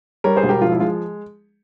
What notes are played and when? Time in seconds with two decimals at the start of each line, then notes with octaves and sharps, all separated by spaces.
0.24 G3 A#4 C#5
0.37 G#4 C5
0.43 E1
0.49 G4 A#4
0.61 F3 F4
0.72 E4
0.80 G#3 F4